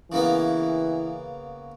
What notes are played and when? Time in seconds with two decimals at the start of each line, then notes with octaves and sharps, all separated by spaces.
0.12 C#3 E3 A#3 B3